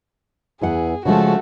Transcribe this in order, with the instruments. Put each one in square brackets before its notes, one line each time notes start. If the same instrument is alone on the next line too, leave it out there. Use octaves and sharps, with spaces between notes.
[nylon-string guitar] E2 E3 F#5 [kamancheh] G#4
[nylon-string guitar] C#3 F3 G#3 [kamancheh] A3 F#4